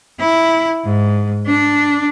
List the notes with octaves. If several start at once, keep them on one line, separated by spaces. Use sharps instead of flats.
E4
G#2
D4